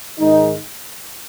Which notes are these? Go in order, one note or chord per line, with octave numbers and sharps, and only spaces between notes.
G#2 D#3 G#3 D#4